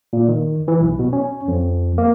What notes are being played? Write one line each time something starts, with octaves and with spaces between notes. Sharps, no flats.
A#2
D#3
E3
B1
B2
C#4
F2
A#3